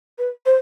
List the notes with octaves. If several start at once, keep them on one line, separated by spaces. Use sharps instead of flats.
B4
C5